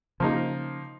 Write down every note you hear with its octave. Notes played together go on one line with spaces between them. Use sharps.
C#3 F3 A#3 D#4